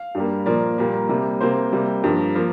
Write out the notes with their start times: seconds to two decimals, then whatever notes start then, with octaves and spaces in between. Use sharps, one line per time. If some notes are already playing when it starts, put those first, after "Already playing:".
Already playing: F5
0.15 G2 G3 A#3
0.46 A#2 F3 A#3 D5
0.78 A#2 G3 A#3
1.09 C3 G3 A#3
1.41 C3 A#3 C5
1.73 C3 G3 A#3
2.03 G2 F3 A#3 A#4
2.35 F3 A#3